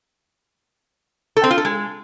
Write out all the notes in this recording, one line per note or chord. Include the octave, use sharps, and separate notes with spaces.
A4
C4
F4
A4
G#3